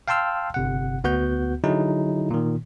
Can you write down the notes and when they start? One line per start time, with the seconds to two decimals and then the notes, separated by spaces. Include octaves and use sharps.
0.08 F5 G5 A5 C6 E6 F6
0.54 G1 C3 F#5
1.04 D2 B3 F#4 F#5 G6
1.64 D3 F#3 D#4 E4 G#4
2.31 A#2 D#3